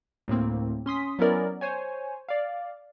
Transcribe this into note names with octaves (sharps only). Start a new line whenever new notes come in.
D2 A2 A#3 C4
C#4 C6 D#6 B6
F#3 B3 C#4 E4 A#4 D5
C5 C#5 G#5
D5 F5